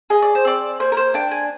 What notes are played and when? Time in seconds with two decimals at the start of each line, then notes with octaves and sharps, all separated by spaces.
0.10 G#4 D#5
0.22 D5
0.35 C5
0.45 C4 D5
0.80 A#3 C5
0.92 A#4
0.97 C5
1.14 D4 G5
1.31 G#5